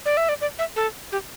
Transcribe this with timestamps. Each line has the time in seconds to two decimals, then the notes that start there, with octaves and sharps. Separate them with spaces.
0.06 D5
0.17 E5
0.29 D5
0.41 D5
0.59 E5
0.76 A4
1.12 G4